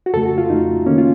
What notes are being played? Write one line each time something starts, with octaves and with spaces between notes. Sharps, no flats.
F#4
F2 C#3 A3 A4
F#4
F4
F2 C#3 A3 D#4
D#3 A#3 C#4
F4